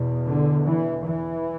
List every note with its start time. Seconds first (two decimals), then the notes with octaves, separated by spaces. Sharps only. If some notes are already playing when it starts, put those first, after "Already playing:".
Already playing: E2 B2
0.25 D3
0.65 E3
1.04 E3